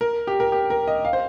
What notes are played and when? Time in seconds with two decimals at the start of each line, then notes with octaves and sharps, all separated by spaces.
0.01 A#4
0.27 G4
0.40 A#4
0.52 G4
0.70 A#4
0.87 D#5
1.05 F5
1.13 C5